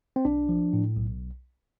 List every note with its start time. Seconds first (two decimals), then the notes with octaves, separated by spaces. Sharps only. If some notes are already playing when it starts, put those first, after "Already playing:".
0.16 C4
0.25 B1 D4
0.49 F3
0.73 A2
0.97 B1